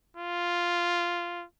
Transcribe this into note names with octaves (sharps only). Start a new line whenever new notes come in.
F4